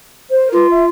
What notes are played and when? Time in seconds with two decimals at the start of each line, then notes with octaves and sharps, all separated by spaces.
0.31 C5
0.46 A#4
0.52 F4 B4
0.68 E5